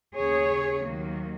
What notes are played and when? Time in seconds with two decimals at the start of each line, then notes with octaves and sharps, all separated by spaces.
0.16 D#2 C#3 A#3 G#4 C#5
0.84 D#2 D#3 F#3 A#3